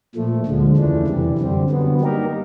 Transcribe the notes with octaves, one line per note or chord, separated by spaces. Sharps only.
A#2 F3 A3
D2 D3 F3 G#3
E2 C#3 E3 A3 D4
F2 C3 E3 G3
F#2 D3 G3 C4
D3 F#3 B3
G3 A#3 D#4 G4 A#4